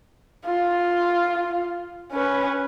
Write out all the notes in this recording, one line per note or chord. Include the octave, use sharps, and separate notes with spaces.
F4
C#4 B4